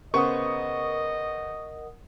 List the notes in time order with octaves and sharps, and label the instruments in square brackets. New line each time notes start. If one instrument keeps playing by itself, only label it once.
[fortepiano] C#3 B3 C5 [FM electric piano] A#4 F#5 D#6 [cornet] D#5 [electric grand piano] C#6